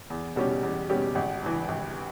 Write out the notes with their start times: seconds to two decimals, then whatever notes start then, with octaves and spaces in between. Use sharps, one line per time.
0.10 E2
0.36 B2 G3 C#4 G4
0.63 E2
0.89 B2 G3 C#4 G4
1.15 G#1
1.42 G2 E3
1.68 G#1